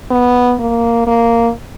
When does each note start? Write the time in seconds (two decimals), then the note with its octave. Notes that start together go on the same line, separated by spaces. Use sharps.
0.11 B3
0.60 A#3
1.07 A#3